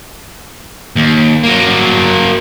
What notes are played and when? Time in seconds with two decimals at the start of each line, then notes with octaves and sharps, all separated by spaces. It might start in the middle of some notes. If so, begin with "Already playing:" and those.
0.96 D#2
1.44 F#3 A#3